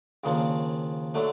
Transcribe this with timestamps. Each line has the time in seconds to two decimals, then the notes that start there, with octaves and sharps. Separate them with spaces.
0.24 D#2 C#3 F3 A#3 D4
1.14 D3 F#3 A3 D4